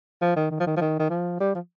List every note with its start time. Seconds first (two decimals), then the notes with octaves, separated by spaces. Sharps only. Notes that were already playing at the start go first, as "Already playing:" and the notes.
0.22 F3
0.36 D#3
0.51 D#3
0.60 F3
0.66 D#3
0.77 F3
0.81 D#3
0.99 D#3
1.10 F3
1.40 G3
1.55 F3